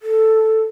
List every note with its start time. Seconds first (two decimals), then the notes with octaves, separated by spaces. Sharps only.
0.02 A4